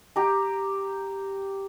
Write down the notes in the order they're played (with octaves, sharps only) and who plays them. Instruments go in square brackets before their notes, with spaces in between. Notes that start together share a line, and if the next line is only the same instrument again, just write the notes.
[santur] G4 A#5